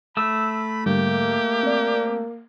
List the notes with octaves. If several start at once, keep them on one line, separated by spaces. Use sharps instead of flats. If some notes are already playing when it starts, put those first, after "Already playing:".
A3 B5 E6
G#2 D3 G3 A#3 G4
C4 D5